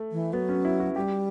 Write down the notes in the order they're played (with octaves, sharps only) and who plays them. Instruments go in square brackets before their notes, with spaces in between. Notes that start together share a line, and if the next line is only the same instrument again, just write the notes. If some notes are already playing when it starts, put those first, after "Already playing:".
Already playing: [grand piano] A3
[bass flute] E3
[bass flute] F#3 [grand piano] B3
[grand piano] C#4
E4
F#4
[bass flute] G3 [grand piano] G4